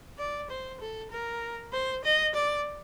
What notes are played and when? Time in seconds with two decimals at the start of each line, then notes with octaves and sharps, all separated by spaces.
0.18 D5
0.50 C5
0.80 A4
1.11 A#4
1.73 C5
2.04 D#5
2.34 D5